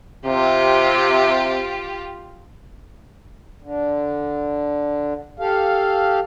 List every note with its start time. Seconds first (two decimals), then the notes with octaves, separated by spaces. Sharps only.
0.25 C3 F4 G4
3.62 D3
5.39 G4 A4 F5